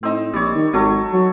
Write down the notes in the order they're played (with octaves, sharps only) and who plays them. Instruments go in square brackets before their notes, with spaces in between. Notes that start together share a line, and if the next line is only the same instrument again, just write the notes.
[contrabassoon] A2 [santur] C4 D#4 E6
[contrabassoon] A#1 [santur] G3 C#5
[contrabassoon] D#3
[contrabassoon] G#1 [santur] F#3 A4 C#6
[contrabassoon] F#3